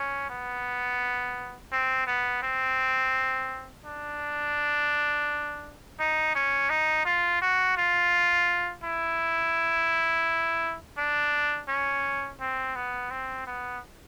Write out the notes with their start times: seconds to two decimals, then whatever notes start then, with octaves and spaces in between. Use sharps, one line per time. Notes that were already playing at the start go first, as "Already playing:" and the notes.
Already playing: C#4
0.29 B3
1.72 C4
2.07 B3
2.42 C4
3.85 D4
5.99 D#4
6.35 C#4
6.70 D#4
7.05 F4
7.41 F#4
7.77 F4
8.83 E4
10.97 D4
11.68 C#4
12.40 C4
12.75 B3
13.11 C4
13.47 B3